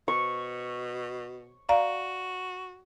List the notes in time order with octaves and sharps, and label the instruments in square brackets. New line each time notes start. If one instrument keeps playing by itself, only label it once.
[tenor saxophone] B2 [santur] C#6
[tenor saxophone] F#4 [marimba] D5 F5 A#5